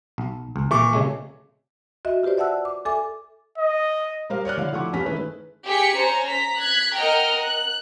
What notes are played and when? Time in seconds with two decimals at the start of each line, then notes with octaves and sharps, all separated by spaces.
0.18 B1
0.56 C#2
0.71 A#2 E3 C#6 D6
0.93 C#3 G#3 A3
2.05 F#4 D#5 E5
2.23 F4 G4 B4 C5 D5
2.38 D5 E5 F#5 A5 E6 F#6
2.65 D6
2.85 A4 E5 G#5 D6
3.58 D#5
4.30 G3 A#4 C5 F5
4.45 C#5 D5 F6 F#6
4.57 D3 E4 C#5 F5
4.72 F3 A3 E4 F#5 C#6 D6
4.93 E2 G2 C#4 B6
5.06 D#3 G#3 A3 E4 B4
5.66 G4 G#4 B6 C#7
5.98 C#4 C5 A#5
6.30 A#5 B6
6.61 F#6 G#6 B6
6.97 A#4 D#5 F#5 G5 A#5 F6
7.40 F#6